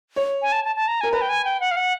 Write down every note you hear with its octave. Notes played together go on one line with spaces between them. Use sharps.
C#5
G#5
A5
A5
A5
A#5
A#4 G#5
B4 A#5
G5
G#5
G5
F#5
F5
F#5